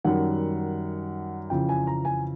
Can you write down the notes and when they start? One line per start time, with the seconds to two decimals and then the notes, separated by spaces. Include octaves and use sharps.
0.04 F#2 D#3 G3 F#5
1.50 F2 C#3 E3 G5
1.69 G#5
1.87 A#5
2.05 G#5